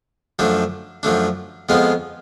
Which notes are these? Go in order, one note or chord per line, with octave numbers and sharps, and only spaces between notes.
F#2 F3 A3 D4
F#2 F3 A3 D4
F2 F3 G#3 B3 F4